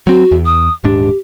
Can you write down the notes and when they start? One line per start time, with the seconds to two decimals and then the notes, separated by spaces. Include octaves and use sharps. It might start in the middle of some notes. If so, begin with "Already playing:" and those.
0.07 F#3 C4 F#4
0.31 E2
0.46 D#6
0.84 D#1 G#2 D4 G4